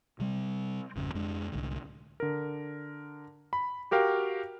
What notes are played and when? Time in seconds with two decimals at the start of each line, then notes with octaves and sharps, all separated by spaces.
0.20 C3 G3 C4
0.96 G#1 F2 C#3
1.15 F2 G#3 D4
1.52 C2 A2 D3
2.20 D3 A#4
3.53 B5
3.91 F#4 G4 A#4 F5 G5